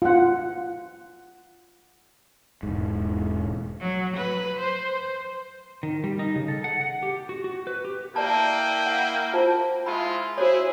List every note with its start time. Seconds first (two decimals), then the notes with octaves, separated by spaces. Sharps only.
0.02 F4 F#5
2.63 E1 G#2
3.81 F#3
4.17 B4
4.59 C5
5.83 D#3
6.04 G3
6.19 D#4
6.35 C#3
6.48 A4
6.64 F#5
6.81 F#5
7.03 G4
7.29 F#4
7.44 F#4
7.67 B4
7.85 G4
8.16 A#3 E4 D5 G5 A5
8.86 F#5
9.33 F4 C5 A5
9.86 G#3 E4 F4 B5
10.38 E4 F#4 G#4 C5 C#5